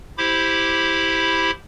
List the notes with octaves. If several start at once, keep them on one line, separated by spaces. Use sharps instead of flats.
E4 G4 C5 B5 D6